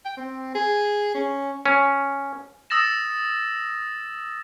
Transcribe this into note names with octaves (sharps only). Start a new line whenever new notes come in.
G5
C4
G#4
C#4
C#4
D#6 E6 A6 A#6 E7